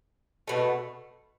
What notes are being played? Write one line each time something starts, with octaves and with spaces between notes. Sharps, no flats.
B2 A3